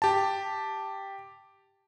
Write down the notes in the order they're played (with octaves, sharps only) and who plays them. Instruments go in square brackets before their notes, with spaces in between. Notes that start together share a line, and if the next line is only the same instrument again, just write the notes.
[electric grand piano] G4 A5